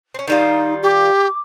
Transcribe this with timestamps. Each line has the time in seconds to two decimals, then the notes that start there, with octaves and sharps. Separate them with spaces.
0.14 C4 C#4
0.28 D#3 G3 D#4 F4
0.83 G4 D6